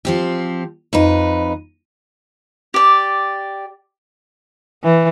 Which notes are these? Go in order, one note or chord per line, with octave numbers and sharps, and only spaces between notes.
F3 C4 G4
F2 D#4 B4
G4 D5
E3